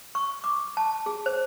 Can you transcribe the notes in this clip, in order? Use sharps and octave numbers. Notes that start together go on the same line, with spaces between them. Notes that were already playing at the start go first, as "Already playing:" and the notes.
C#6
D6
A5
G#4
C5